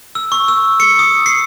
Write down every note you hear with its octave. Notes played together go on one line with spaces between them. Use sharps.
E6
C#6
E6
C#7
D#6
C7